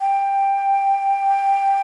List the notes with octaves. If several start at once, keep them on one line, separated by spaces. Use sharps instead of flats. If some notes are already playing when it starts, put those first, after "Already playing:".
G5